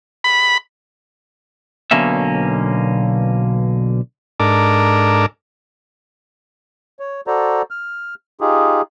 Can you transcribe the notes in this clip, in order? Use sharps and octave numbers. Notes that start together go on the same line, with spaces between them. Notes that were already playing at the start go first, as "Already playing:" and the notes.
B5
B1 B2 D3 A#3 C#4 E5
G#2 D4 A4 A#4 D6
C#5
F#4 A4 C5 D5 A#5
F6
D#4 F4 G4 G#4